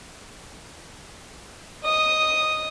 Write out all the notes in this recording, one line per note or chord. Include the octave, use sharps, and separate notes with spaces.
D#5 D#6